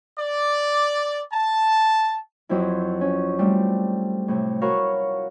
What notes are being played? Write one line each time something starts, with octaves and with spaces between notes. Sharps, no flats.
D5
A5
F2 F#3 C4 E4
C#4
G3 A3 C4
A2 C3
F#4 A#4 C#5 F5 B5 C#6